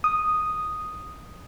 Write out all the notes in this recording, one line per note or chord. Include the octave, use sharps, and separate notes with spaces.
D#6